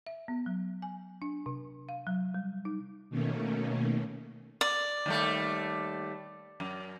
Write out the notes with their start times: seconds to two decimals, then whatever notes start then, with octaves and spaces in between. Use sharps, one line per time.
0.07 E5
0.28 B3
0.46 F#3
0.82 G#5
1.22 D4
1.46 C3
1.89 F5
2.07 F#3
2.34 G3
2.65 D#4
3.10 B2 D#3 A3 A#3 C#4
4.61 D5
5.06 D#2 G3 A3
6.60 F#2